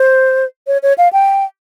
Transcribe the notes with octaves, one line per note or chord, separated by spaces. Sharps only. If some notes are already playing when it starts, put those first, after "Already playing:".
Already playing: C5
C#5
C#5
F5
G5